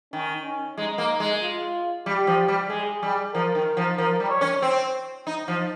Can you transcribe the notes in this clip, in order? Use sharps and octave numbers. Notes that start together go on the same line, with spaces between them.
D#3 C#4
C#4
G#3 D#4
A#3
G#3
F4
G3 G4
F3
G3
G#3 G#4
G3
F3 A#4
D#3
F3
F3 A#4
G3
C#5
C#4
C4
D#4
F3